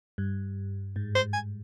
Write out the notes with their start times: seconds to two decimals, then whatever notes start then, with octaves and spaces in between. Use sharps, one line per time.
0.18 G2
0.96 G#2
1.15 C5
1.33 G#5